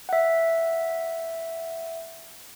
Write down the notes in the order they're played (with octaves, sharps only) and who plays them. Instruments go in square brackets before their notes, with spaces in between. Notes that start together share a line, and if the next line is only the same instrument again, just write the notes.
[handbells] E5 F#5